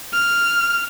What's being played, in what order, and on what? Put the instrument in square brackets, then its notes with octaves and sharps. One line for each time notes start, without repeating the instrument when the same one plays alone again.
[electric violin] F6